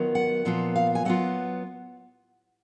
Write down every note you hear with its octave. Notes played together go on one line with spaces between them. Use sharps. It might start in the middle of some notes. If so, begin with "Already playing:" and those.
Already playing: D#3 F#3 B3 F4
F#5
A#2 F3 B3 F4
F5
G#5
F#3 B3 F4 F#5